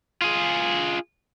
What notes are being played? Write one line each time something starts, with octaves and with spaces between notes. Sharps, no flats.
F4 G#4